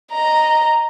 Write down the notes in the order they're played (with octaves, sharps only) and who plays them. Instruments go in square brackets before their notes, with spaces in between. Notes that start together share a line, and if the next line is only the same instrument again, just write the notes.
[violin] D#5 A#5